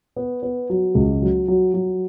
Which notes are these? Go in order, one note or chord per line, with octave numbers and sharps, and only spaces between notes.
B3
B3
F#3
C#2
F#3
F#3
F#3